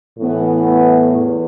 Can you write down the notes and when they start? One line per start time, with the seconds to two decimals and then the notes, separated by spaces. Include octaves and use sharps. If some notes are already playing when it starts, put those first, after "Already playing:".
0.18 A2 E3 B3
1.17 E2